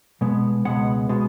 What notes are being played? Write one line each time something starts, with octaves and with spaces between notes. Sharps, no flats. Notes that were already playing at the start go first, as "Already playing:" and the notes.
B2 G#3 B3
C#2 B2 G#3 B3 F#5
B2 G#3 B3